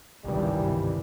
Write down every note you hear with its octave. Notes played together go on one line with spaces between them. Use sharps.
G#1 C#2 G2 C3 D#3 E3 G3